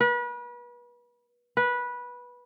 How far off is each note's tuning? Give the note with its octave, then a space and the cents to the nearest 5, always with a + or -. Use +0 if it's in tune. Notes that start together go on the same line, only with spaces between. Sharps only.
B4 -35
B4 -15